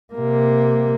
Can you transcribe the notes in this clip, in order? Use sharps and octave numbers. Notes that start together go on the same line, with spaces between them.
C3 A#3